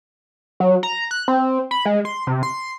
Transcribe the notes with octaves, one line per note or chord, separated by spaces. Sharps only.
F#3
A#5
F#6
C4
B5
G#3
C6
C3
C6